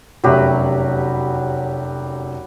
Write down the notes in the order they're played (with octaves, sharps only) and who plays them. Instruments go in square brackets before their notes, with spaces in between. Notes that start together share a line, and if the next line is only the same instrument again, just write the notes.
[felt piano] F1 F#2 E5 [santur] F#3 G4 B4